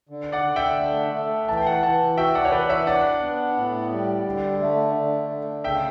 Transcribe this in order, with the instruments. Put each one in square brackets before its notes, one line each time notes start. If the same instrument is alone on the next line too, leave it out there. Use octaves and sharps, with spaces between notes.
[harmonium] D3
[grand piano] D5 F#5
[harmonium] D3
[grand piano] E5 G5
[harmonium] A3
A3
[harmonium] E3 [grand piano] A5
[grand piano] G5
F#5 A5
[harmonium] E3 [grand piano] F#5 A5
[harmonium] F#4 [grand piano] E5 G5
[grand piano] D5 F#5
C#5
[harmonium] E3 [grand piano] B4 D5
[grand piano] C#5 E5
[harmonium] D4 [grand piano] D5 F#5
[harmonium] B3
A2
G3
D3
A3
D3
A3
[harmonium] C#3 [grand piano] E5 G5